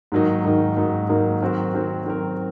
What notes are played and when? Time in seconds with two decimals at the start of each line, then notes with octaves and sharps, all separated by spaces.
0.12 G#2 D#3 F#3 A#3 D#4
0.45 G#2 D#3 F#3 A#3 D#4
0.77 G#2 D#3 F#3 A#3 D#4
1.09 G#2 D#3 F#3 A#3 D#4
1.41 D#3 F#3 C4 F#4 A#4
1.74 D#3 F#3 C4 F#4 A#4
2.06 D#3 F#3 C4 F#4 A#4